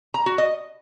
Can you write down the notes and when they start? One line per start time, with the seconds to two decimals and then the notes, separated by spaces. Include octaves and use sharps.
0.14 A#5
0.26 F#4
0.38 D#5